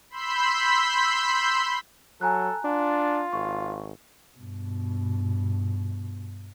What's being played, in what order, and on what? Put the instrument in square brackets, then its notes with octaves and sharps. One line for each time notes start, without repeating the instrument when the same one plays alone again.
[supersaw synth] B5 C6 E6 G6 B6
[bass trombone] F#3 [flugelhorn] A4 [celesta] G#5 A#5 F#6
[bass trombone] D4 [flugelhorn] F4
[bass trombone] G#1 [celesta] C#6
[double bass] G2 B2